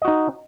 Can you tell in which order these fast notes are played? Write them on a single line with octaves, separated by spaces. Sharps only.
D#5 F#4 D#4